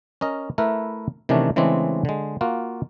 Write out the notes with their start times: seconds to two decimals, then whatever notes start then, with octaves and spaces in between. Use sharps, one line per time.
0.21 C#4 A#4 D#5
0.58 A3 E4 A#4 B4
1.29 C3 D#3 E3 A3 C#4 D4
1.56 C#3 E3 G#3 A3 C4 D4
2.05 D3 G#3
2.41 A#3 F4 F#4